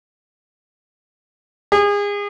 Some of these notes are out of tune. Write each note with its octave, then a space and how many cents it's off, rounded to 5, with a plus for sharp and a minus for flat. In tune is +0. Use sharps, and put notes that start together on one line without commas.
G#4 -30